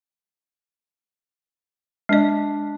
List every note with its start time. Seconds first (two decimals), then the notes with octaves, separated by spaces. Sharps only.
2.09 G#3 D4 D#5